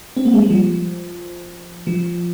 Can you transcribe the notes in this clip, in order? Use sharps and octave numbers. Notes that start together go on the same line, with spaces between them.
C4
A#3
G#3
G3
F3
F3